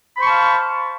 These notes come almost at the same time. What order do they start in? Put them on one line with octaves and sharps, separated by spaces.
B5 C5 C#6 A5 F5